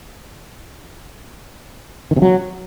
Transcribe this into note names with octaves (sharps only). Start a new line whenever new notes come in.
D#3
C3
F#3